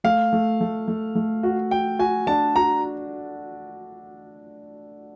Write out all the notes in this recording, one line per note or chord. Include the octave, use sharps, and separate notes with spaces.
A3 F5
A3
A3
A3
A3
F#4
F#4 G5
F#4 G#5
D4 A5
F#4 A#5